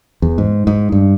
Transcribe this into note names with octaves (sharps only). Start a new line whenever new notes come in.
E2
G#2
G#2
G2